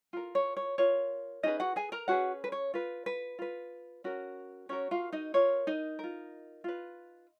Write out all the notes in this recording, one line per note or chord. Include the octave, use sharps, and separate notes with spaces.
F4 A#4
C#5
C#5
F4 A#4 C#5
C#4 D#4 G#4 B4 D#5
F#4 F#5
G#4 G#5
A#4 A#5
C#4 F#4 G#4 B4 F#5
B4
C#5
F4 B4
B4
F4 B4
C#4 F#4 A#4
C#4 F#4 A#4 C#5
F4 F5
D#4 D#5
F4 A#4 C#5
D#4 D#5
F4 A#4
F4 B4